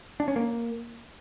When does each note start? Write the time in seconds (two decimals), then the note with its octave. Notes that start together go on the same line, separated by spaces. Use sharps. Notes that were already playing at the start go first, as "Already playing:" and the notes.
0.20 D4
0.28 C#4
0.36 A#3